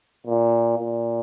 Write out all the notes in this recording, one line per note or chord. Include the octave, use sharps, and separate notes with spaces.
A#2
A#2